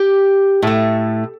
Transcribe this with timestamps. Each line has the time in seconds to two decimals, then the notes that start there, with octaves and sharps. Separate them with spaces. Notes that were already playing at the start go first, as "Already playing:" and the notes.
Already playing: G4
0.62 A2 A3